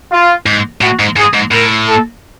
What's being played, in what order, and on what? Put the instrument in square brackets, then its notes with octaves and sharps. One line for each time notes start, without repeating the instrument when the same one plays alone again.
[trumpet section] F4
[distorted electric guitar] G#2
[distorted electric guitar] A2 [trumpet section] F#4
[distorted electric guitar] G#2
[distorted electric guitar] G#2 [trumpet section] G#4
[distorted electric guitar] G#2
[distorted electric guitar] A2 [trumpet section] A#4
[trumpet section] A4